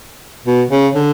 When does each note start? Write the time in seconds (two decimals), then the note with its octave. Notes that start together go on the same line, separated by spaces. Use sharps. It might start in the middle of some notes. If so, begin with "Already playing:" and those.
0.46 B2
0.71 C#3
0.95 D3